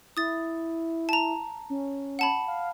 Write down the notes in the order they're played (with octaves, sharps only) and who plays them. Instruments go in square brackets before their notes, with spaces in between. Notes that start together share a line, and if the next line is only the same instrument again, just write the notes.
[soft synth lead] E4 [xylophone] D#6 A6
[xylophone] A5 A#5
[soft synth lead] C#4
[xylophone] F#5 A5 B5
[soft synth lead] F5